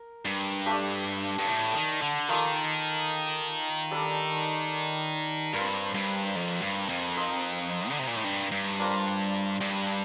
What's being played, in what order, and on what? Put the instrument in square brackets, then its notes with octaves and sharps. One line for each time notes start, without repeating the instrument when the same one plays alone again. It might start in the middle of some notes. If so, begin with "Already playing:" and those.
Already playing: [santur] A#4
[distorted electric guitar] G2
[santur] A3 D4 G4 D5
[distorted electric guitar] G2
A2
D#3
D3
[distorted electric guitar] D#3 [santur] A#3 F4 A4 D#5
[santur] G3 D4 A4 D5
[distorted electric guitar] G2 [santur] C4 F4 A#4
[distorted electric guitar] G2
F2
G2
F2
[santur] C4 D#4 A#4 D#5
[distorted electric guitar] D3
C3
A#2
A2
G2
G2
[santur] A#3 D4 F4 C5
[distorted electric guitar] G2